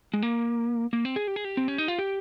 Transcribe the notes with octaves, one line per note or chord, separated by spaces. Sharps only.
G#3
A#3
A#3
C4
G#4
G4
G#4
G4
C4
C#4
D#4
F4
G4